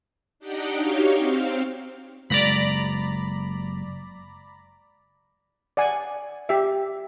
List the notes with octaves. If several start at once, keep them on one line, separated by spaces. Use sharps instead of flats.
D4 D#4 G4 D#5 F#5 G5
D#4 F#4 G4 C#5 F5
C4 F5
F#1 G#3 D5 A#5 B5
D5 F#5 G#5
G4 E5